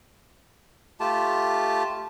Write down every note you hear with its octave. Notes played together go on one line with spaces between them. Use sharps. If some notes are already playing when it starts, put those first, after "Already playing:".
A3 F4 G4 A5